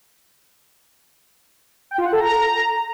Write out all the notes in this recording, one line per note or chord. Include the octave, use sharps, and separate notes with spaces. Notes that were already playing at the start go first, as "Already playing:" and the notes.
G5
F4
F#5
A4
A#5